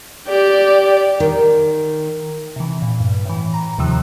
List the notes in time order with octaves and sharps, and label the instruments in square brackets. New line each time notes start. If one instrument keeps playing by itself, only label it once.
[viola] G4 [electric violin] D5
[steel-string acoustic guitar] D#3
[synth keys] C3 E3
A#2
G2
A2 E3
A#5
D#2 C3 D#3 F3 E6 F#6